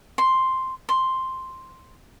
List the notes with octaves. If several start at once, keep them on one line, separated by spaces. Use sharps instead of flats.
C6
C6